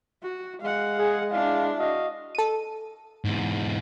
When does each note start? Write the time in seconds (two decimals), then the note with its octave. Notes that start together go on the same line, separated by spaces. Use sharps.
0.23 F#4
0.61 G#3 F5 F#5
0.98 G#4
1.31 D4 E4 F5
1.78 F#4 D#5 F5
2.35 A4 D#7
3.25 E2 G#2